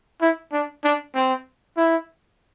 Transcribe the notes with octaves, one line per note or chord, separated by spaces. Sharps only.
E4
D4
D4
C4
E4